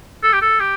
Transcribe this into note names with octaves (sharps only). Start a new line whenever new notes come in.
A4
G4
A4
G4